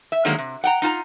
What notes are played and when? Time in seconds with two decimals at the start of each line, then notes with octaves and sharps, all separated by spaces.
0.12 E5
0.25 D3 D#3 F#3 G#3 A#3
0.39 C3
0.64 F#5 G5 A#5
0.82 D#4 F4 A5 A#5